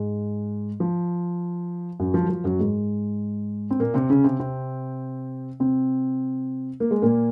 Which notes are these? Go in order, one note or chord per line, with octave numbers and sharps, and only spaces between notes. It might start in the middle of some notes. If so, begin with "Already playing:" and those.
Already playing: G#2 G#3
F3
F#2 F#3
F3
F#3
F3
F#2 F#3
G#2 G#3
C4
A#2 A#3
C3 C4
C#3 C#4
C3 C4
C3 C4
C3 C4
A#3
G#3
A#2 A#3